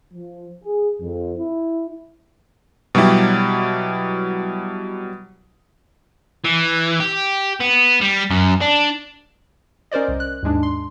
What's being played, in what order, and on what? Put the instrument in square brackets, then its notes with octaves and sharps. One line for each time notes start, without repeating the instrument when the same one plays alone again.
[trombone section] F3
G#4
F2
E4
[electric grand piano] B2 F#3 G3 E4 G4
[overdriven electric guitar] E3
G4
B3
G3
F#2
D4
[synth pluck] C#4 A#4 C5 D5 D#5
C2
F#6
D#2 G#2 G#3 D4
C6